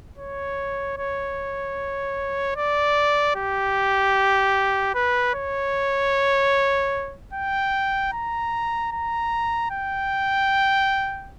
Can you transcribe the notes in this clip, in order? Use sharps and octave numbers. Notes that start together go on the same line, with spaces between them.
C#5
C#5
D5
G4
B4
C#5
G5
A#5
A#5
G5